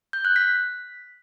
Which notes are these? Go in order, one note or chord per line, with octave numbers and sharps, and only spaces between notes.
G6
F#6
B6